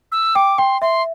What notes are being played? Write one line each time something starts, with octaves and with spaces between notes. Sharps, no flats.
E6
G5 D6
G5 C6
E5 C6